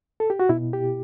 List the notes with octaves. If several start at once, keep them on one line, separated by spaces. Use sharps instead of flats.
A4
G4
F#4
B2 E4
G4